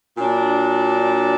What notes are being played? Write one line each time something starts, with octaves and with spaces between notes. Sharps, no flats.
A#2 F#3 D4